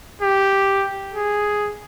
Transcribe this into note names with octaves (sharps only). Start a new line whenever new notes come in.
G4
G#4